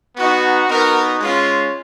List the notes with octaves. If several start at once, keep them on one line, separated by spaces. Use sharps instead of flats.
B3 D#4 F#4
B3 D#4 F#4 A#4
G#3 C#4 F4